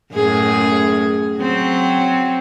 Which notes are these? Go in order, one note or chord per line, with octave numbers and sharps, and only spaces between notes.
F#2 A2 G#4
F#3 C4